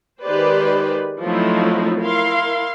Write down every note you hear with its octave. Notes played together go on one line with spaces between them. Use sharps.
D#3 G#3 G4 B4 C5 D5
F3 F#3 A3 C4 D#4 E4
E4 A#4 F5 C6